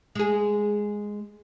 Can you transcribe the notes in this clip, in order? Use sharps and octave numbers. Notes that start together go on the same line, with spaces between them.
G#3 G#4